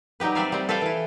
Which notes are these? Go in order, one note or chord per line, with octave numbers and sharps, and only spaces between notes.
F#3 G3 D#4 G4 B4
C4 B4 D5 E5 F5 G#5
G3 C4
A4 B4 C5 F5 G5
E3 E4